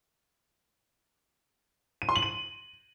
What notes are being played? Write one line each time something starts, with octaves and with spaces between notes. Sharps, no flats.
D#7
C6
F#7
D#7